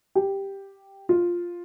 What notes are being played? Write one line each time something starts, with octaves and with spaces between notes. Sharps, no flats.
G4
F4